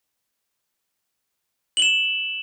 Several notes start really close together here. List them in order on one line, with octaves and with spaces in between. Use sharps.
F#7 G7 E7